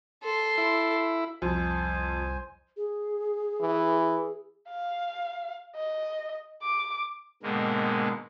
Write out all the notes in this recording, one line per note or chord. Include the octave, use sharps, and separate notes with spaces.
A4 C6
E4
C2 F2 C5 G#5
G#4
E3
F5
D#5
D6
G#2 B2 D3 D#3 G#3 A#3